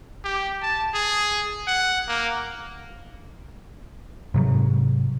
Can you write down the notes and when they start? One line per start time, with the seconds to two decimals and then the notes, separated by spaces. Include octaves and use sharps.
0.24 G4
0.62 A5
0.94 G#4
1.67 F#5
2.08 A#3
4.34 G#2 C3 F#3